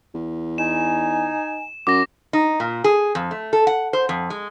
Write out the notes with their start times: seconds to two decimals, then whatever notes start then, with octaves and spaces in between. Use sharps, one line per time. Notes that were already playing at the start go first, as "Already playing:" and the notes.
0.15 E2
0.58 D#4 G#5 E7
1.87 F#2 D6 A#6
2.33 D#4
2.60 A#2
2.84 G#4
3.15 F2
3.31 A3
3.53 A4
3.67 F#5
3.93 C5
4.09 F2
4.30 G#3